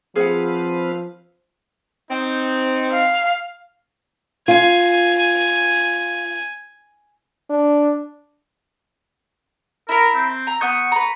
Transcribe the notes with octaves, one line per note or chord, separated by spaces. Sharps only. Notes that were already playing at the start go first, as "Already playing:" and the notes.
F3 C4 G#4 B4 F5 F#5
C4 D#4
F5
F4 G#5
D4
E4 A#4 A#5
C4
A#5
B3 C#6 D#6 G6
B4 A#5